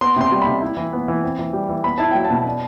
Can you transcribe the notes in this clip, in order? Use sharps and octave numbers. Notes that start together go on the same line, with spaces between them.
B3 C6
C3 C6
G3
C3 B5
E4
E3
B3
E3
C4
E3
G3
E3
B3 B5
E4 A5
F#3 G5
A5
B2
D4